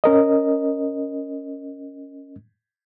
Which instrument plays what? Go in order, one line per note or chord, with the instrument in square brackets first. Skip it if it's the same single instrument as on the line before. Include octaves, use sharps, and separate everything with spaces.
[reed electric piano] C#4 A#4 D#5